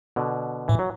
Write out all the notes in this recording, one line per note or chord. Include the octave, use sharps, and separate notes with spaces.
B2 D3
A2 E3
F#3